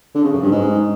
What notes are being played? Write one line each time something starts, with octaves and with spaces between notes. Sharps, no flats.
D3
C#3
F#2
G2
G#2